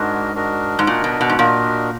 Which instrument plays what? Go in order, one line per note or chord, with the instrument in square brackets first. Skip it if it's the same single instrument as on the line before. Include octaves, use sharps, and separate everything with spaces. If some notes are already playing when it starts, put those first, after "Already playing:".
Already playing: [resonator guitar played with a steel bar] G#2 [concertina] D4 F#4 A#4 D#5
[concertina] D4 F#4 A#4 D#5
[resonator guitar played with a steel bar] G#2
[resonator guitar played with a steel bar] A#2 [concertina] D4 F#4 A#4 D#5
[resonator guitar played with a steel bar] B2
B2
G#2
[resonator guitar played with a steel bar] A#2 [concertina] D4 F#4 A#4 D#5